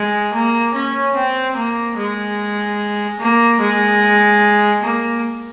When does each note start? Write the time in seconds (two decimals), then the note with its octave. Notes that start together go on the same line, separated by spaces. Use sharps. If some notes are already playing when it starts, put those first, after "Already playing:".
Already playing: G#3
0.34 A#3
0.75 C#4
1.16 C4
1.57 A#3
1.97 G#3
3.20 A#3
3.60 G#3
4.82 A#3